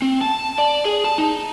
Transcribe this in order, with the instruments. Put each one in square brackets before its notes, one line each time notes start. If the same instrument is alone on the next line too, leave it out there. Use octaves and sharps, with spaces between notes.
[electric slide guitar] C4
A5
D5
G#4
A5
D#4